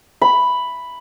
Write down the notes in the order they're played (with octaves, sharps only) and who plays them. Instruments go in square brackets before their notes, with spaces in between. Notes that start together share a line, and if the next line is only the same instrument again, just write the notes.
[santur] B5